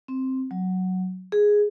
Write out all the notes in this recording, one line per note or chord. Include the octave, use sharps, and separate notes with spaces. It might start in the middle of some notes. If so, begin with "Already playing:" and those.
C4
F#3
G#4